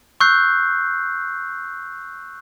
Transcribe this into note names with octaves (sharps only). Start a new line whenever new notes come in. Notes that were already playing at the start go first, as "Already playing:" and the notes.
C#6 E6 F#6 G6 C7